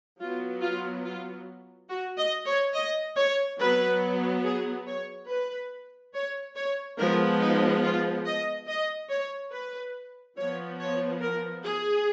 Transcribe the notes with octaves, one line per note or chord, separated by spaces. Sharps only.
F#3 B3 F4
F4
F4
F#4
D#5
C#5
D#5
C#5
F#3 B3 B4
G#4
C#5
B4
C#5
C#5
F3 G#3 B3 A#4
D#4
F4
D#5
D#5
C#5
B4
F3 B3 C#5
C#5
A#4
G#4